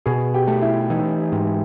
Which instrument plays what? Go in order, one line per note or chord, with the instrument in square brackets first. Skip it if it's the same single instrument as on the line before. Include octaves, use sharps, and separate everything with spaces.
[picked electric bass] B2 [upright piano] G#4
[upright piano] G4
[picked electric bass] A3
[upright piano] E4
[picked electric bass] E3 [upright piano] D#4
[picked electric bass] G#2